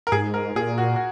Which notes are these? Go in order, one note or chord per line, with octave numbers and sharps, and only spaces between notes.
A#4
G#2 G#4
A#4
A#2 G#4
F#4
F#4